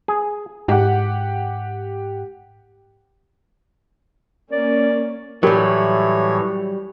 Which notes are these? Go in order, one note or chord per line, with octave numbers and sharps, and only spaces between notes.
G#4
G#2 G4 F#5
A#3 C#4 D5
A2 E3 F#3 G3 G4 A#4 C#5